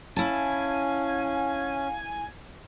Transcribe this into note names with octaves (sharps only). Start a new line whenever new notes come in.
C#4 E4 F5 G#5 A5